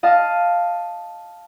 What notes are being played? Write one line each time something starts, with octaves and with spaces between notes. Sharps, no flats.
D#5 F5 A5